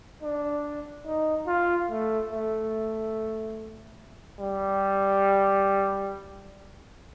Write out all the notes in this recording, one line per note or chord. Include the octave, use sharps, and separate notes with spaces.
D4
D#4
F4
A3
A3
G3